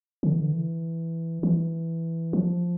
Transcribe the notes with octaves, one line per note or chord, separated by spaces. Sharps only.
D3
E3
D3
E3
E3
F3